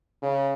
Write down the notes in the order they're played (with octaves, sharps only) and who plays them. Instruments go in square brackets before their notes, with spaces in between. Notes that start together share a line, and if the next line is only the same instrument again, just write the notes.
[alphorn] C#3